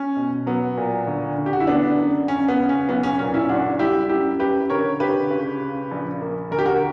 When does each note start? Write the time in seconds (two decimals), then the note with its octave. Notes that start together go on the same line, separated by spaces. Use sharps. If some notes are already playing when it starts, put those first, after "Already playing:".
Already playing: C#4
0.16 B2
0.47 F#3 B3
0.77 A#2
1.07 D2
1.38 D3
1.46 G4
1.53 F#4
1.60 E4
1.67 D3 B3 D4
1.98 F#2
2.28 C#3 C#4
2.48 B3
2.58 C#3
2.69 C#4
2.88 B1 B3
3.03 C#4
3.19 A#2 C#4
3.34 C#4 E4
3.49 F#1 D4 F#4
3.79 G3 E4 G4
4.09 F#2 E4 G4
4.40 F#2 G4 B4
4.70 D3 A#4 C#5
5.00 D3 G4 B4
5.31 C#2
5.61 C#3
5.91 A#1
6.21 A#3
6.51 D2 A#4
6.59 G4
6.66 F#4 A#4